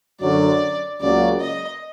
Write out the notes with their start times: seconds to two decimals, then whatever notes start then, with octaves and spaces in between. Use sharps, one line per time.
0.21 F#2 D3 F#3 D5
1.00 C#2 C#3 F#3 A#3 D5
1.40 D#5